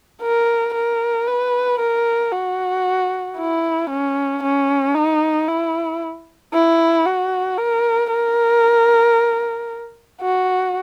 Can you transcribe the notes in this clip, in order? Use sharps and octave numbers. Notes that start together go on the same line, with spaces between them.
A#4
A#4
B4
A#4
F#4
E4
C#4
C#4
D#4
E4
E4
F#4
A#4
A#4
F#4